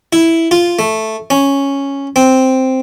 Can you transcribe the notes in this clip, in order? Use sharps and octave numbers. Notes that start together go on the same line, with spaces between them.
E4
F4
A3
C#4
C4